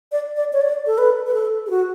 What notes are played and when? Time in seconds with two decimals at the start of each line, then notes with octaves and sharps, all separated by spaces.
0.12 D5
0.37 D5
0.53 C#5
0.61 D5
0.87 A4
0.98 B4
1.27 B4
1.34 A4
1.66 G#4
1.70 F#4